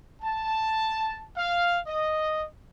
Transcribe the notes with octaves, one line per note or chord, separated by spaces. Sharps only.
A5
F5
D#5